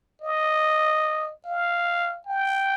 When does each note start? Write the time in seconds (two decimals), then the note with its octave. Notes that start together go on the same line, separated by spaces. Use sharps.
0.22 D#5
1.45 F5
2.27 G5